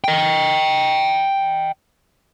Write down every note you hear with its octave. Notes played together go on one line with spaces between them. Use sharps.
D#5 G5